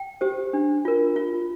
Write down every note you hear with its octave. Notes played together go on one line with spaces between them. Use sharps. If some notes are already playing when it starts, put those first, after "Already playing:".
Already playing: G5
G4 C5
D4
F4 A#4
F4